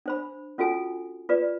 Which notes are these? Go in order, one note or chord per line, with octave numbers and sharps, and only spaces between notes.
D4 C5 B5
C#4 F4 F#4 A4 G#5
F4 B4 D5